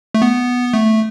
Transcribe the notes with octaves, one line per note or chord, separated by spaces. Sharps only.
A3
B3
A3